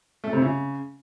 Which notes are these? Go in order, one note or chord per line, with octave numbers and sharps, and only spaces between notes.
A3
C3
C#3